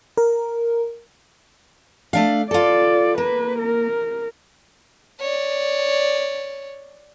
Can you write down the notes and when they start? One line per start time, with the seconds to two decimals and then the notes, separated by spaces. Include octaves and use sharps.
0.17 A#4
2.13 A3 D4 F5
2.51 F4 A4 D5
3.18 A#3 B4
3.59 A#4
5.20 C#5 D5